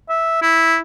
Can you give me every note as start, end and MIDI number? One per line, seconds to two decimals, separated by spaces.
0.09 0.39 76
0.42 0.78 64